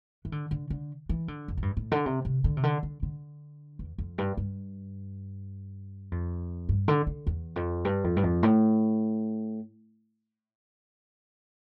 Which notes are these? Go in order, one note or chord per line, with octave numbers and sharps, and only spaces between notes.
E3
D3
D3
D3
E3
D3
F2
A2
G2
A2
D3
C3
C3
D3
C3
D3
D3
D3
E2
F2
G2
G2
F2
G2
D3
D3
E2
F2
G2
F2
G2
F2
A2